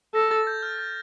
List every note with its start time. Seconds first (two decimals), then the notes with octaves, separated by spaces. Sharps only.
0.14 A4 A#6
0.31 A6
0.47 G6
0.63 F6
0.79 G6